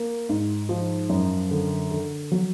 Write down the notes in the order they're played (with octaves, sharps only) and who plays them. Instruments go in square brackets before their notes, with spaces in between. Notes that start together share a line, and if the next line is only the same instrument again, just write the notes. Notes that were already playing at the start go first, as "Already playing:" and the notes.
Already playing: [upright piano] A#3
G#2
F3
F#2
D3
D3
F#3